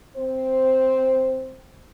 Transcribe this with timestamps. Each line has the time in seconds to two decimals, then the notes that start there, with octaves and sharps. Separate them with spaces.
0.17 C4 C5